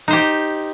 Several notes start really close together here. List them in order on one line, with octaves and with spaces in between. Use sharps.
D#4 C5 G4